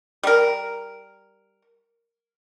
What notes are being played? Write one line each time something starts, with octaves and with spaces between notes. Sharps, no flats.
G3 A#4